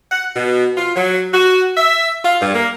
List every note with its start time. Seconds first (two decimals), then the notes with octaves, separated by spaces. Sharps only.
0.12 F#5
0.35 B2
0.77 F4
0.96 F#3
1.34 F#4
1.77 E5
2.24 F4
2.41 G2
2.55 A#3